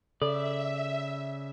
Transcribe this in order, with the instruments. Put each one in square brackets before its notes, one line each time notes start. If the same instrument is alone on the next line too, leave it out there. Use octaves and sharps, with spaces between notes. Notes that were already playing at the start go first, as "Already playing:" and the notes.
[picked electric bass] C#3 [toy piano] A4 [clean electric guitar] D5 [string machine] E5